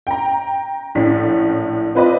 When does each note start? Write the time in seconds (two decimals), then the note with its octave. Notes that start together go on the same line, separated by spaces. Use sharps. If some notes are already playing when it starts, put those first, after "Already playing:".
0.07 G5 A#5
0.95 A#1 A2 C#4 B6
1.95 C4 F4 B4 D5 D#5 B5